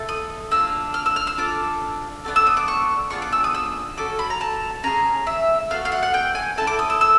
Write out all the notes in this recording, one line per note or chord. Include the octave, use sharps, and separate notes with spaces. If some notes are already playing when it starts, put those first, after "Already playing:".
Already playing: A3 F4 A4
D#6
A#3 D4 F4 E6
F6
E6
F6
E6
D4 F4 A4 D6
B3 D4 F#4 A4
E6
D#6
D6
C#6
B3 D4 F4 G#4 C#6
D6
E6
D#6
E6
C#4 F#4 A4 D6
B5
A#5
A5
C#4 F4 G#4 A#5
E5
B3 D#4 F#4 A4 F5
F5
F#5
F#5
G5
G#5
C#4 E4 A4 A5
D6
D#6
E6
E6